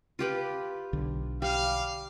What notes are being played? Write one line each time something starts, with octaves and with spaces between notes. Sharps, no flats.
F4 G4 B4
B1 D3
G3 F5